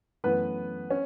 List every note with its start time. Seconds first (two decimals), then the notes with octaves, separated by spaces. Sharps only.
0.24 F#2 E3 A3 B3 B4
0.90 C#4